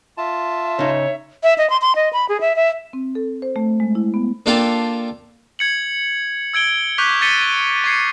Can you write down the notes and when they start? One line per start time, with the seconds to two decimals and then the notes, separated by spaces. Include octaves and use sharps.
0.18 F4 E5 A5
0.79 C#3 D#4 C#5
1.43 E5
1.58 D#5
1.70 C6
1.82 C6
1.96 D#5
2.13 B5
2.29 G#4
2.41 E5
2.56 E5
2.93 C4
3.15 A4
3.42 C5
3.56 A3
3.80 G#3
3.95 E4
4.14 B3
4.46 A#3 D4 F4 A4 F5 G5
5.59 G#6 C#7 F#7
6.54 E6 G#6 D7 G7
6.98 C#6 D6 F#6 G6 B6 F7
7.21 G#6 A6 B6 C#7 D#7 G7
7.84 C#6 G#6 C7 C#7